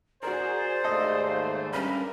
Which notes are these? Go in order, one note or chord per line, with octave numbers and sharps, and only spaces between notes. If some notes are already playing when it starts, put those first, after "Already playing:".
F#4 G#4 A#4 C5 D5
D#2 G#2 A3 A4 D#5
G2 G3 C#4 A#4 B5